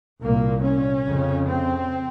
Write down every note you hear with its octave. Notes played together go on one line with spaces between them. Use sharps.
C2 A#2 A#3
C#4
F2 C#3
C4